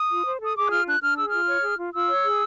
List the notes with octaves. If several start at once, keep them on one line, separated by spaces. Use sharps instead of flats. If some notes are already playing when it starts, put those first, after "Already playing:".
Already playing: D#6
F4
C5
A4 D#6
G#4 D6
F#6
F4 F6
D4 F#6
D4 F6
G#4 E6
F4 F6
C#5
G#4
F4
F4 E6
C#5
G#4